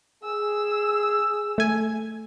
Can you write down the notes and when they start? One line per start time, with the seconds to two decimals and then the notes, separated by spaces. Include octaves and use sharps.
0.24 G#4 E6
1.58 A3 G#5